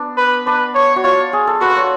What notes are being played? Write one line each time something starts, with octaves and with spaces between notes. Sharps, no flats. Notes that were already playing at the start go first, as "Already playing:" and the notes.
Already playing: B3 D4
B4
D4 B4
C#5
F#4
F4 C#5
G#4
A4
F#4 B4
C#5